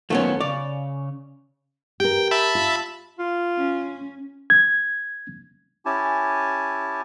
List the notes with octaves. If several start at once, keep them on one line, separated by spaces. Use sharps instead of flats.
F#2 D#3 F3 A3 B3 C#4
C#3 C#5 D5
G4 A#4 G5
E5 A5 B5
F4
F4
C#4
G#6
C#4 E4 G4 G#5 A5